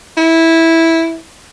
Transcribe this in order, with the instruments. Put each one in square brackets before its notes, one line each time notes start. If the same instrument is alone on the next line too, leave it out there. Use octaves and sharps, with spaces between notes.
[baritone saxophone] E4